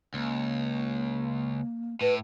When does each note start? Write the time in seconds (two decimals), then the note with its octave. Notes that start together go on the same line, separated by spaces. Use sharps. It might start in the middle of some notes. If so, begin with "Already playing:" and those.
0.14 C#2 A#3
2.01 A2 B4